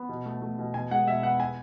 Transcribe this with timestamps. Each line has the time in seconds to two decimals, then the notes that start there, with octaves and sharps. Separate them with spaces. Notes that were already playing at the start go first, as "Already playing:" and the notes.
Already playing: B3
0.09 B2
0.26 A3
0.42 A3
0.59 B2
0.74 B2 G#5
0.91 G#3 F#5
1.07 B2 E5
1.23 B3 F#5
1.40 G#5